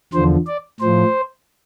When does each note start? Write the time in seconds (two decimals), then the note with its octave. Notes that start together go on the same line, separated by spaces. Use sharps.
0.13 E2 D3 F3 C5
0.47 D5
0.80 A2 F3 C5